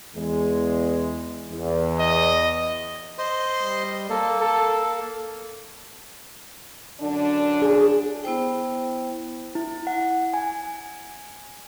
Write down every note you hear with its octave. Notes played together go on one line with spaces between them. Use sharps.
E2 G#3
E2
D#5
C5 D#5 C6
G3
A#3 A4
A4
F#2 D3 D4
G#4
B3 E4 C5 G5
E4
F#5
G#5